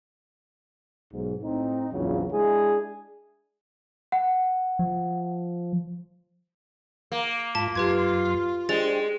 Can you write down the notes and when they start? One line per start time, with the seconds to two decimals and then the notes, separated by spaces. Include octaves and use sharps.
1.12 B1 G#2
1.43 A2 C4 D#4
1.93 A#1 E2 C#3 F3 F#3
2.32 G#3 D4 E4 G#4
4.12 F#5
4.79 F3
7.12 A#3
7.55 G#2 F4 A5 B5
7.75 F#2 F4 G4 B4 C6 G#6
8.69 G#3 D4 G4 C5 A6 F7